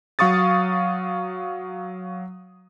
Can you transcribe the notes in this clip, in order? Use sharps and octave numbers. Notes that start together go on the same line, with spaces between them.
F#3 F5 C#6 D#6 A6